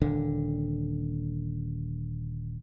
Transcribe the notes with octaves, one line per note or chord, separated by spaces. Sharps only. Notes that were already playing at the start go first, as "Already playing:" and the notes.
D#1 D3